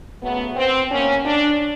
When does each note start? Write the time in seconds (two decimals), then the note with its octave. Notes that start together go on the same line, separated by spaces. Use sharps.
0.22 C#3 F#3 A3 B3
0.56 C4
0.91 B2 F#3 A#3 C#4
1.26 D4